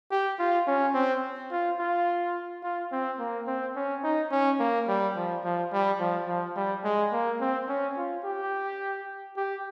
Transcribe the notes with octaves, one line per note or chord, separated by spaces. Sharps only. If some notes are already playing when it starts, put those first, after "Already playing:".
G4
F4
C#4
C4
F4
F4
F4
C4
A#3
C4
C#4
D#4
C#4
A#3
G3
F3
F3
G3
F3
F3
G3
G#3
A#3
C4
C#4
F4
G4
G4